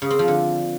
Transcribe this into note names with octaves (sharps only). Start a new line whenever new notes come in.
C#3
C4
F3
D3